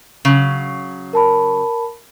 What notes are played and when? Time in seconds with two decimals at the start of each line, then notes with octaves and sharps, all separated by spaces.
0.25 C#3 F#3
1.13 A#4 A5 B5